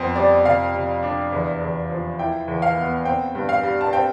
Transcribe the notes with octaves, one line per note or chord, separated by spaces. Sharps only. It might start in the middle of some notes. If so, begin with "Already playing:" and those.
Already playing: F2 B3 C5
G3 D5
C3 F5
C3
D4
E2
E2
F3
E4 G5
E2
F5
B3
C4 G5
G2
F5
G3
A5
C4 G5